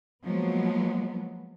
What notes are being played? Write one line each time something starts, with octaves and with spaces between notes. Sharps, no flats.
F3 F#3 G#3 A#3 B3